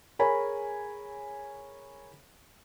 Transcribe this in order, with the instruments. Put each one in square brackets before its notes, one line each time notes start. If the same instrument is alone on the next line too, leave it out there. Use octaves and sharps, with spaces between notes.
[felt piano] G#4 A#4 C#5 G#5 B5